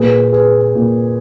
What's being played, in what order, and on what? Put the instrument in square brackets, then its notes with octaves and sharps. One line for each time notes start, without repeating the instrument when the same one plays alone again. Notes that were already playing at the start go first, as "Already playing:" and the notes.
Already playing: [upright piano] A#2 G#4 B4
G#4 B4
A#2